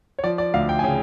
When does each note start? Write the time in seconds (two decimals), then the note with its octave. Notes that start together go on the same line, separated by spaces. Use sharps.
0.19 C#5
0.24 F3 D5
0.38 D5
0.54 D2 F5
0.69 G5
0.79 G#5
0.84 C#3 G5